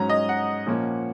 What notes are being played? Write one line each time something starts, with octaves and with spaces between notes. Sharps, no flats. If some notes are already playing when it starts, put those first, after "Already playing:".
Already playing: G#2 F#3 C#4 A#5
D#5
F#5
A#2 F3 A#3 C#4